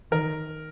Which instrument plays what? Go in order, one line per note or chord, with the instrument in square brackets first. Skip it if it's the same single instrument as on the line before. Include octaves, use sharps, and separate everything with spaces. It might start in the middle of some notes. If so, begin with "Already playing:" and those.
[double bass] D#3 [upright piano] A#4